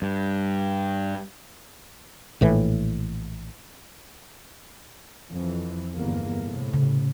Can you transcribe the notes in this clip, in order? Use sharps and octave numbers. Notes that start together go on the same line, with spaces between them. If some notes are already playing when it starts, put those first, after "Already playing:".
G2
A#1 A2 E3
F2 E3
G1 E2 A#3
A2 C3
C#3